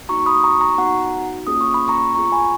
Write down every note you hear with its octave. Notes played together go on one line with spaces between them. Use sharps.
A#3 D#4 F#4 A#5 C#6
B5 D#6
A#5 C#6
A#5 C#6
B3 D#4 F#4 F#5 A#5
A#3 C#4 F4 G#4 D#6
C#6
B5
A#5 C#6
B3 F4 G#4 A#5 C#6
G#5 B5